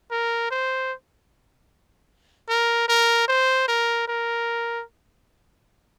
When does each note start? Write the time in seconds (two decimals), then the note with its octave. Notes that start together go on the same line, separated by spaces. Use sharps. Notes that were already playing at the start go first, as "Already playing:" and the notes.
0.11 A#4
0.51 C5
2.49 A#4
2.88 A#4
3.28 C5
3.68 A#4
4.07 A#4